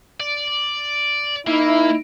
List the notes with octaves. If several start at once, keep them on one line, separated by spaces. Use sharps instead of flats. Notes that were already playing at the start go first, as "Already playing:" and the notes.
D5
A#3 D#4 E4